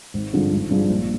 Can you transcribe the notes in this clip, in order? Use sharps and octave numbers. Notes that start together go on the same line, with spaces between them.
G#1
G2 D3 F3 G#3
G#1
G2 F3 G#3
A#1